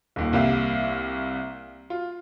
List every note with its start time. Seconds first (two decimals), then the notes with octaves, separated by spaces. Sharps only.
0.16 D#1 D#2
0.33 C2 A#3 G4 E5 F5
1.90 F4